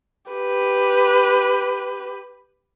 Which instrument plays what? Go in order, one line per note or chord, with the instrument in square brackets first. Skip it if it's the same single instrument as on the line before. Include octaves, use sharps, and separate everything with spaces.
[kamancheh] G4 B4